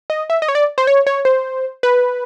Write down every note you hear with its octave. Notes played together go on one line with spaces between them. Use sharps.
D#5
E5
D#5
C#5
D5
C5
C#5
C#5
C5
B4